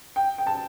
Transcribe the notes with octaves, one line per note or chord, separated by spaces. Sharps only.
G5
G5
A5